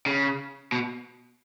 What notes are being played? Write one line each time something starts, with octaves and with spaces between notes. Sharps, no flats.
C#3
B2